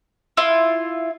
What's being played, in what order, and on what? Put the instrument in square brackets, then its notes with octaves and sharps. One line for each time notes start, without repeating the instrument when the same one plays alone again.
[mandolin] E4 F4